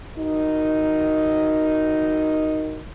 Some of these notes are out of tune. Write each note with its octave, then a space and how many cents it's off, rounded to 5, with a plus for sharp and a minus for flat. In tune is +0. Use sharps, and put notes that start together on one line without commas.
D#4 +0 F#4 +0 A#4 +0